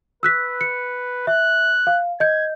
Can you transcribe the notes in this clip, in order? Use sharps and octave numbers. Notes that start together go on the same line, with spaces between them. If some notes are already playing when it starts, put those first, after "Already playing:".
B4 E6 F#6 B6
C#7
E5 F#6
F5
D#5 G6 G#6